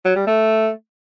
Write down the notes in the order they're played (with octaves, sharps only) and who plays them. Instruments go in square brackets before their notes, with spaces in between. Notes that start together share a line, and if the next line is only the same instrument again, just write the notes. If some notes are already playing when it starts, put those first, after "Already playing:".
[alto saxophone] F#3
G3
A3